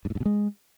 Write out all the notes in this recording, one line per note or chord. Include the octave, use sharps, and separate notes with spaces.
G2
A2
G2
B2
G#3